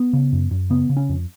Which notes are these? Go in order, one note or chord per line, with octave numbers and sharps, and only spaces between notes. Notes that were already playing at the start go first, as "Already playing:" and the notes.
Already playing: B3
C#3
F#2
F#2
C#3 B3
C#3
C#4
F2